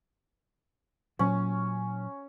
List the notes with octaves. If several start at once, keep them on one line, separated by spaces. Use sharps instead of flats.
A#2 F#3 C#4